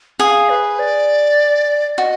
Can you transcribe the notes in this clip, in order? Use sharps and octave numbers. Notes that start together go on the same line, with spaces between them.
G#4 F5 F#5
B4
D5
F#4 D#5